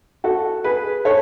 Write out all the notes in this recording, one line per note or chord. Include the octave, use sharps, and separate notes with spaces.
F#4 A4
G#4 B4
A4 C#5